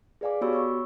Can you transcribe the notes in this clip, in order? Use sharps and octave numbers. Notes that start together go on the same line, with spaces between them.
G#4 B4 D5 F5 G#5 D6
B3 F#4 G4 C#5 B5 E6
C#5 C#6 E6